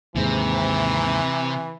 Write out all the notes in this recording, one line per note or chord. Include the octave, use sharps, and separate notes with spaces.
D#2 G#2 C3 E3